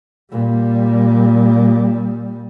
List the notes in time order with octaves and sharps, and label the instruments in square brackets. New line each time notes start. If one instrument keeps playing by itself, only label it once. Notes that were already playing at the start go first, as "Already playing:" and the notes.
[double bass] A#2 G3